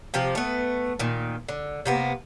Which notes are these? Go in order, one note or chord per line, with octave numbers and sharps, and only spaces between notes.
C3 F3 G4
A3 B3
A#2 D#3
D3
C3 A#3 B3